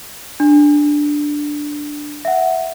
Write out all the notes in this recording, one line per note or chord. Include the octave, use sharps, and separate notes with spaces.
D4
E5 F#5